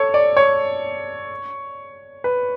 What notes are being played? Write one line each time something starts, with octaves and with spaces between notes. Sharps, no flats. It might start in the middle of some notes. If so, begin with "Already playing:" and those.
Already playing: A4 C#5
D5
C#5
B4